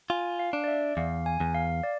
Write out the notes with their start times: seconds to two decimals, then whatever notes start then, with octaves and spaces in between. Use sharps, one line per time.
0.10 F4 G#5
0.39 F5
0.53 D4
0.64 D5
0.68 E5
0.97 E2 F5
1.26 G#5
1.40 E2
1.54 F5
1.83 D5